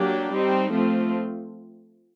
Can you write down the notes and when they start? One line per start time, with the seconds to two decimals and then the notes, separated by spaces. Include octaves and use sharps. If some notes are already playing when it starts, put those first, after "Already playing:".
Already playing: F#3 A#3 D4 G4
0.31 G3 C4 D#4
0.71 F3 A3 C4 F4